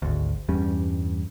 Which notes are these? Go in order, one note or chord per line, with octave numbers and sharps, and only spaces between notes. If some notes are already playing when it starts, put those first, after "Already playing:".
G#1 D2
E2 G2 G3 C#4